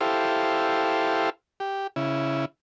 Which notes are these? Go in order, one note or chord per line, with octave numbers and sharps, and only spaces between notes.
E4 G4 A4 C5 F5
G4
C#3 E4